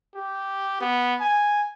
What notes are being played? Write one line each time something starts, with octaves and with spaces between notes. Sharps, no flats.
G4
B3
G#5